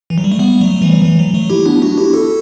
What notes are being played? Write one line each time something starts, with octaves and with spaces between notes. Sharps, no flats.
E3
F#3
G3
A3
G3 B3
F#3 A3
E3 G3
F#3
E3
F#3
F#3 A3
E4 G4
B3 D4
D4 F#4
E4 G4
F#4 A4